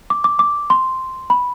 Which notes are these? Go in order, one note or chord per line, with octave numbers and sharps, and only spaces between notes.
D6
D6
D6
C6
B5